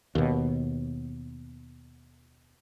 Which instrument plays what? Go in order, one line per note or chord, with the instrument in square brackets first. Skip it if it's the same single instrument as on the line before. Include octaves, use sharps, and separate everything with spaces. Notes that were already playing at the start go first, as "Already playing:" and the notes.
[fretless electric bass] D#2 B2